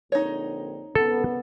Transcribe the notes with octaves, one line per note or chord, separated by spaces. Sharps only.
A#1 D3 C4 D#4 C#5
C2 C#3 B3 A4